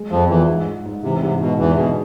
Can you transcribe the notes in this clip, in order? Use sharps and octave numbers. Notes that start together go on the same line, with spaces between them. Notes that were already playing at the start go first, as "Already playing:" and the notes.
Already playing: G#3
F2 F3 G#3
E2 E3 F4
G#2
G#2
G#2
C3 E3
G#2 C3
G#2 B2
E2 D3 E3
B2 G#4